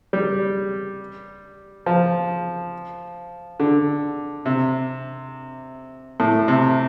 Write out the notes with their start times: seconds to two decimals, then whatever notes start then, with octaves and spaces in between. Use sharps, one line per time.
0.13 G3
1.86 F3
3.60 D3
4.46 C3
6.20 A2
6.48 C3